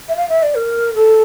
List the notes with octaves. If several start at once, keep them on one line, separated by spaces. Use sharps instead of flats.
E5
F5
E5
D5
A#4
A4